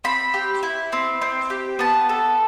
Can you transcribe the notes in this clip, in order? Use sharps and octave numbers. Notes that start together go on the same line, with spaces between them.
C4 B5
G4
E4
C4
C4
G4
B3 A5
A4